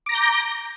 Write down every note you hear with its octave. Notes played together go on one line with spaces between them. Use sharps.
A#5 D6 G6 A#6